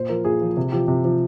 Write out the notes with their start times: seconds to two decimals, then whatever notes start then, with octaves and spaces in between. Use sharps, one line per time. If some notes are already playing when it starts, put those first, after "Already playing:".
Already playing: A#2 C5
0.09 F3 A#4
0.25 A#2 G#4
0.41 F3
0.57 C3
0.72 F3 G4
0.88 C3
1.05 F3